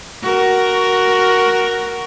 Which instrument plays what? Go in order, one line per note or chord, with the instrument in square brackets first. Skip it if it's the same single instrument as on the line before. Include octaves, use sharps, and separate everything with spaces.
[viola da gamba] F#4 A#4